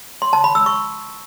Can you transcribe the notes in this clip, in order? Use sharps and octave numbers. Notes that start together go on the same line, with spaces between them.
C6
A5
B5
E6
C#6